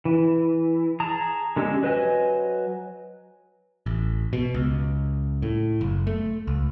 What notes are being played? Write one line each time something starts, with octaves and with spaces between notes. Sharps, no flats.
E3
G#4 A5 A#5 D#6
D3 G#3 C#4 G4 E6
F#3 B4 C5 D#5 G#5
A1
B2
C#2
A2
F#1
A3
C#2